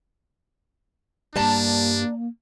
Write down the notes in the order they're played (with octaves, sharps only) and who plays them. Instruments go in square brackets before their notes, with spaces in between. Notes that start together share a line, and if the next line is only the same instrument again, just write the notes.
[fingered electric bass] G2 G3 [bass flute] A#3 [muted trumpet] D4 [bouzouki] D5 A5 A#5